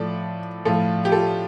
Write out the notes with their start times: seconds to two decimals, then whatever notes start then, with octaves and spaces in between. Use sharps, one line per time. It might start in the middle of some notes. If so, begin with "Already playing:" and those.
Already playing: A2 F3 A4 D5
0.65 A2 F3 F4 A4
1.05 G4
1.12 F4 A4